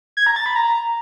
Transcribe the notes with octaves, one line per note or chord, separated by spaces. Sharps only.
G#6
A#5
A6
B5
A#5